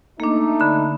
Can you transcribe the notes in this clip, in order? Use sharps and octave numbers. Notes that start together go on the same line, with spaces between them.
A3 A#3 D4 D#4
D3 B5